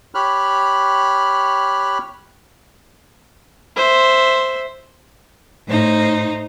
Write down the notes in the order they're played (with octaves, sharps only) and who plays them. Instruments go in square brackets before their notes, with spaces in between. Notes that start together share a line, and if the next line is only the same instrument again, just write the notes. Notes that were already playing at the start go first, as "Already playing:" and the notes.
[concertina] G4 C#5 B5 F6 F#6
[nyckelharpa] C5 E5
[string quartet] A2 D#4 C5